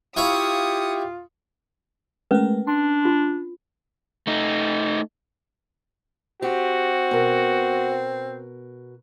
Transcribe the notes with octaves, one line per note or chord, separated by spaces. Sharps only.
E4 F4 G4 C#5 F5 D#6 C#7
G#3 A3 C#4 A#4 B4
D4 C6
F4
A3 D#4
C4 F#4 G4
B2 A#4